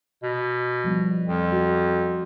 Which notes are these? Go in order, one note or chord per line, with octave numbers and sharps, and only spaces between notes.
B2
F3 G3 B3
F2
F#4